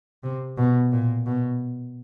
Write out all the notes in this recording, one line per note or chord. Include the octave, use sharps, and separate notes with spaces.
C3
B2
A#2
B2